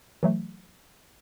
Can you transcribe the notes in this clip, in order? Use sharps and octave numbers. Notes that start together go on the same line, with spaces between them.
E3 F#3 A3